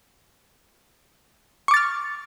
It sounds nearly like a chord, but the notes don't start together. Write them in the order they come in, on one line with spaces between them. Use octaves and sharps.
C#6 D6 A6 F6